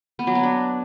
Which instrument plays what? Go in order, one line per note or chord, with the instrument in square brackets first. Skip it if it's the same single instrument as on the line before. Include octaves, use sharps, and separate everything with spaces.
[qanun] B3
F#3
B3
D4